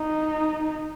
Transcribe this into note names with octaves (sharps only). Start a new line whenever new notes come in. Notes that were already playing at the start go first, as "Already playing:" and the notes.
Already playing: D#4